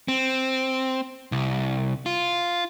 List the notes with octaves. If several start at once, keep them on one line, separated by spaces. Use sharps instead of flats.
C4
C2
F4